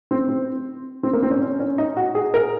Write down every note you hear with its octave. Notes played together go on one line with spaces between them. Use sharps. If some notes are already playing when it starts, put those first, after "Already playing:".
C4
C4
C4
A#3
C4
C#4
C#4
C#4
D#4
F#4
G#4
A#4